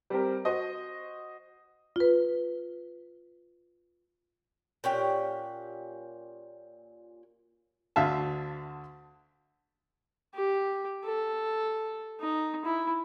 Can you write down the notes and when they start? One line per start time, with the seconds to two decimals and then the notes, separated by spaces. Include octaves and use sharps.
0.10 G3 C4 G4 A#4
0.45 F#4 C5 D#5
1.96 F4 B4
4.84 A#2 C#4 G4 F#5
7.96 D2 D3 E5 F5 A5
10.35 G4
11.05 A4
12.20 D#4
12.65 E4